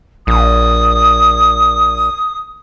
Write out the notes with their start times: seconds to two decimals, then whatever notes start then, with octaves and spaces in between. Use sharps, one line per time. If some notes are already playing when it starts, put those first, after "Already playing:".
0.27 A#1 D#6